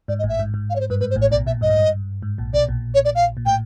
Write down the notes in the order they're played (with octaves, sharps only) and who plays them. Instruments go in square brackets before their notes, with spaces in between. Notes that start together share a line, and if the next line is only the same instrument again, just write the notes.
[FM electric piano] G#2 [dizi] D5
[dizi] D#5
[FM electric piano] A1 A2
[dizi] E5
[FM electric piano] G#2
G#2
[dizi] F5
C#5
C5
[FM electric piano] G2 [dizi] B4
[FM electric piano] G#2 [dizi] B4
[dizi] C5
[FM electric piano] A1 A2
[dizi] C#5
[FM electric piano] B1 B2 [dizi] D5
[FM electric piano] A#1 A#2 [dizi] E5
[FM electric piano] G2 [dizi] D#5
[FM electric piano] G#2
G2
G#2
A#1 A#2
[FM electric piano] B1 B2 [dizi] D5
[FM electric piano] A#1 A#2
[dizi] C#5
D5
F5
[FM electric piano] A#2
[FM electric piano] A2 [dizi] G5